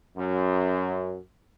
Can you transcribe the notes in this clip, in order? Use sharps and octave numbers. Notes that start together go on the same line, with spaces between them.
F#2